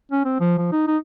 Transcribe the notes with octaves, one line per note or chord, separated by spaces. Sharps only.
C#4
C4
F3
F3
D#4
D#4